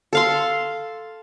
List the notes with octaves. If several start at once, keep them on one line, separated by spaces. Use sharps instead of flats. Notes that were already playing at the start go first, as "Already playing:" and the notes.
A4 F5 C6